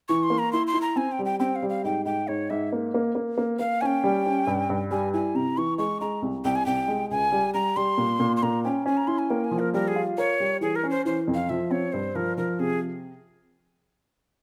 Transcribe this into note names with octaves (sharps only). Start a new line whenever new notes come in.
E3 C#6
C6
A#3
A#5
E4 C6
C6
E4
A#5
C4 G#5
G5
G3
G5
C4 G5
F5
G3
F5
G#2 G5
G#2 G5
G#2 C#5
G#2 E5
A#3
A#3
A#3
A#3
A#3 F5
C#4 G5 G#5
G3
C#4
G2
G2
G3 G#5
E4 G#5
C3 A#5
E3 C#6
G#3 C#6
G#3 A#5
C2
C2 G5
G#5
C2 G5
G#3
C#2 G#5
G3
G3 A#5
G3 C6
A#2
A#2
C6
A#2 A#5
C#4 G5
C#4 G#5
A#5
E4 C6
G#5
A#3 G5
G#5
F3
A#4
G3 A#4
G#4
F4
A#4 C#5
G3
E3 G#4
A#4
C#4
C5
E3 C5
F2
F5
F3 E5
C4 C#5
G2 C5
F3 A#4
F3 A#4
C3 G#4